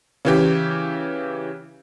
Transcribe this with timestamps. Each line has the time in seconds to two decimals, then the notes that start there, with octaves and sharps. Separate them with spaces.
0.25 C#3 E3 G4